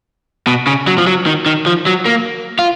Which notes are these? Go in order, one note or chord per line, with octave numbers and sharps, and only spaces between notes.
B2
C#3
F#3
F3
F#3
D#3
D#3
F3
F#3
A#3
F4